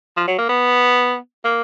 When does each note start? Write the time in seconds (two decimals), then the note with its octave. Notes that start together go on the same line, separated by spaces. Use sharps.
0.17 F3
0.27 F#3
0.38 A#3
0.49 B3
1.45 A#3